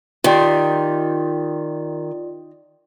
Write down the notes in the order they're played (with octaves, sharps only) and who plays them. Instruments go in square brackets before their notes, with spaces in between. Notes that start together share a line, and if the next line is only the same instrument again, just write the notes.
[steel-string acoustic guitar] D#3 [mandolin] D#4 G4 C6 [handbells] F4 D5